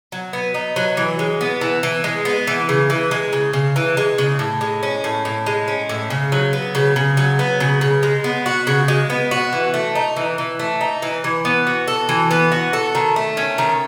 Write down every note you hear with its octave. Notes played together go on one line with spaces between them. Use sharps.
F#3
B3
D#4
F#3
E3
G#3
B3
E3
E3
G#3
B3
E3
C#3
E3
G#3
C#3
C#3
E3
G#3
C#3
A2
G#3
C#4
A2
A2
G#3
C#4
A2
C#3
F#3
B3
C#3
C#3
F#3
B3
C#3
C#3
G#3
B3
F#4
C#3
G#3
B3
F#4
E3
A3
D#4
E3
E3
A3
D#4
E3
E3
B3
F#4
A4
E3
B3
F#4
A4
D#3
A3
C#4
D#3